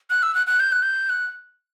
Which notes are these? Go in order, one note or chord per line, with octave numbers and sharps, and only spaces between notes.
F#6
E6
F#6
F#6
G6
F#6
G6
F#6